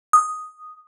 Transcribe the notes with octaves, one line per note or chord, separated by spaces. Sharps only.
D#6